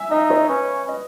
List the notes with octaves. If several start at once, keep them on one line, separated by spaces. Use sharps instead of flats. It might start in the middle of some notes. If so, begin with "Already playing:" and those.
Already playing: E5 G#5
D#4 D#5
C#5
C#4 B4
D#5